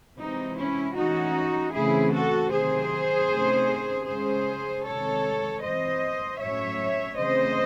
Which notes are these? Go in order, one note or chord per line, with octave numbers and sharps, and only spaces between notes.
C3 E3 G#3 C4 D#4
C#4 E4
E3 A3 C#4 D#4 F#4
C#3 E3 A3 C4 E4 G#4
F#4 A4
C3 D#3 F#3 C4 G#4 C5
C3 D#3 A3 C#4
C#3 G#3 C#4 G#4 C5
C3 D#3 G#3 A4 C#5
E3 C4 C5 D#5
A2 F#3 A3 C#4 C#5 E5
C#3 E3 A3 C4 C5 D#5